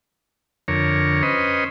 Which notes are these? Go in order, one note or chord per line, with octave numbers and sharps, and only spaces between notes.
F2 D3 A#4 C#5
C#4 B4 C5 D#5